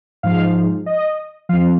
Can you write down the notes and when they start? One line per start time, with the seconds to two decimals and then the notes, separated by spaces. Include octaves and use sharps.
0.23 G#2 F3 F5
0.86 D#5
1.49 F3 F5
1.53 F2